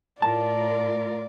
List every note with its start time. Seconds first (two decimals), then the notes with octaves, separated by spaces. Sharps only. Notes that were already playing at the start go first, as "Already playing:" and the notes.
0.22 A2 F4 A#4 D5 A5